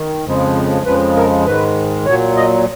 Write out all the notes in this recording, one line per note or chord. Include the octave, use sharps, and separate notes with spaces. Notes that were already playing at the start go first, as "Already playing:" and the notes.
Already playing: D#3
F2 C#3 F3 G#3
F2 C#3 F3 G#3 B4
A#4
G#2 D#3 G#3 B4
A#2 F#3 C#5
D#5